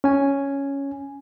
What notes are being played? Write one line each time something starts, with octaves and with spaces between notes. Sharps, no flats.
C#4 G#5